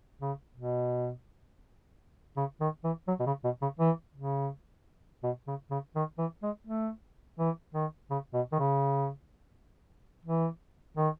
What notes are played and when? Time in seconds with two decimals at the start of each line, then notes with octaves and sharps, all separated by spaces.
0.21 C#3
0.56 B2
2.37 C#3
2.61 D#3
2.84 E3
3.08 F#3
3.20 B2
3.26 C#3
3.44 B2
3.62 C#3
3.80 E3
4.16 C#3
5.24 B2
5.47 C#3
5.71 C#3
5.96 D#3
6.18 E3
6.43 G#3
6.67 A3
7.39 E3
7.75 D#3
8.10 C#3
8.34 B2
8.52 D#3
8.59 C#3
10.25 E3
10.97 D#3